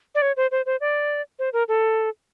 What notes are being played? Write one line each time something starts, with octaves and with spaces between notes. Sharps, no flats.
D5
C#5
C5
C5
C5
D5
C5
A#4
A4